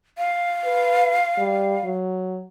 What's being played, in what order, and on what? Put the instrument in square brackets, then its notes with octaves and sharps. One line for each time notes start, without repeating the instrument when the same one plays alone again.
[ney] F5
[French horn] B4
G3
F#3